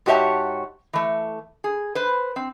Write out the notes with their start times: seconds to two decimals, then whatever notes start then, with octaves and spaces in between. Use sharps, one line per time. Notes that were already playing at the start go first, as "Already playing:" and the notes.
0.06 G#2 F#4 G4 C#5 E5 A5
0.93 E3 A3
1.64 G#4
1.95 B4 C5
2.36 C4